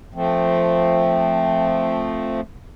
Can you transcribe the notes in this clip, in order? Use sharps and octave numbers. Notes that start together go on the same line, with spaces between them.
F3 A3 C4